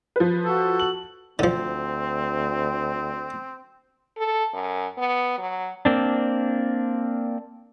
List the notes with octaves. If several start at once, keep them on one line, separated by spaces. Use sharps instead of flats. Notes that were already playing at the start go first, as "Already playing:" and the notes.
F3 B4
F#4 A4
F#7
D2 D3 F3 C4
A4
F#2
B3
F#3
A#3 C4 D4